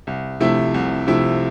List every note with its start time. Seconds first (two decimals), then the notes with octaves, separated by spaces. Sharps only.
0.07 C2
0.40 C3 F3 A3 E4
0.74 C2
1.07 C3 F3 A3 E4